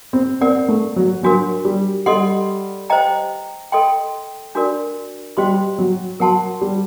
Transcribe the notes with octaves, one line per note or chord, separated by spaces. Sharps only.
C4
C4 A#4 D5 F#5
A3
F#3
F#3 D4 F#4 A#4
G3
G3 A4 D#5 F#5 C6
C5 D#5 G5 A#5
A4 D#5 G5 C6
D4 F#4 A#4 D5
G3 F#4 C5 D#5 G5 C6
F#3
F#3 A#4 F#5 A5 C6
G3